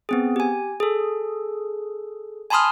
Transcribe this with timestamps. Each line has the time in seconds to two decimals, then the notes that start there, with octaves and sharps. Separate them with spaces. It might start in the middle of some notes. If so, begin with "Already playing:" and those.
0.09 B3 C4 G#4
0.36 G4 G#5
0.80 G#4 A4
2.50 G#5 A5 B5 C6 D#6 F6